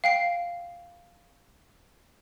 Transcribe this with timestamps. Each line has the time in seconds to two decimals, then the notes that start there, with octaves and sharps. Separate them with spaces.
0.04 F5 G5 C7